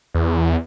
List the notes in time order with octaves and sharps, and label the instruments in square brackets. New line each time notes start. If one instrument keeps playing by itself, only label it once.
[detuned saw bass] E2